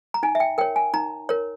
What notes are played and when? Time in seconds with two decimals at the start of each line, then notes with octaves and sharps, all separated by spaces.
0.14 A#5
0.23 D#4 G#5
0.35 E5
0.40 G5
0.58 A#4 C#5 G5
0.76 G#5
0.94 D#4 A#5
1.29 A#4 C#5